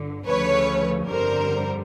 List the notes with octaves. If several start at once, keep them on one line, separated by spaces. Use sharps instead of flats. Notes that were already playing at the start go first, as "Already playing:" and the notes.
Already playing: G1 G2 D3
D2 C#3 F3 A3 C#4 B4 C#5
G1 F2 D3 G3 A#4 C5